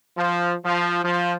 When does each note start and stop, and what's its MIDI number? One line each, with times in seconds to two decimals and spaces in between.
0.17 0.55 53
0.65 1.00 53
1.04 1.35 53